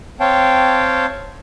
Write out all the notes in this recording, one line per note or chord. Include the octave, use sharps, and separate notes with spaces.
C4 C#5 F5 G5 A5